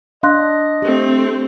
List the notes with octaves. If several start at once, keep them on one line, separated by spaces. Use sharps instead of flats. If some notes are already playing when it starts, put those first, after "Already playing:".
D4 D#5 F5 C6 F#6
A3 C4 G4